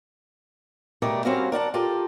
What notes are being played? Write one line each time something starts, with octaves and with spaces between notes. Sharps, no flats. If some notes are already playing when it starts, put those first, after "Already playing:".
B2 G3 A3 A#4 D5
G3 C4 C#4 F#4 A#4 F5
A#4 D5 F#5 A5
F4 G4 A4 A#4